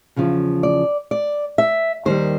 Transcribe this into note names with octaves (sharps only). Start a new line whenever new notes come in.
E2 C#3 F3
D5
D5
E5
D#2 D#3 G3 C5